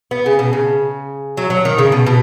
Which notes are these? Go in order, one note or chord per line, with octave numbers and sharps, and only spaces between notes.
B3
C#3
B2
C#3
F#3
F#3
D#3
C#3
B2
B2